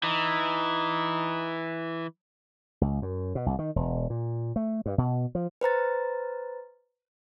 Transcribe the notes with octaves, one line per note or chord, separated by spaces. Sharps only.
E3 D#4
C#2
F#2
B2
C2
D#3
E1
A#2
A3
G2
B2
F3
B4 C5 A#5 A6